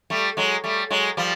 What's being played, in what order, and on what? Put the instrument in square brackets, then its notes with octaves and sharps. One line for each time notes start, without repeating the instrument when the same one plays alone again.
[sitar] G3 A3
F#3 G#3
G3 A3
F#3 G#3
F3 G3